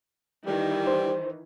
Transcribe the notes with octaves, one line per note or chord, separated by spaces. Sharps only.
D#3 E3 G3
C5